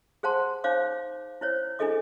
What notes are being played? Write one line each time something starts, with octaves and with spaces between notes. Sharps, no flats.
G#4 C5 F#5 A5 C6
D#4 C5 C#5 F5 D6
E4 C5 C#5
D4 E4 G#4 A4 D#5 D6